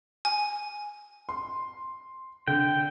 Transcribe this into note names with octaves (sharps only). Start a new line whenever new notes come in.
G#5
C6
D3 G5